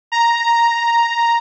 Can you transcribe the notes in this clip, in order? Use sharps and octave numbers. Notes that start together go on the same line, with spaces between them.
A#5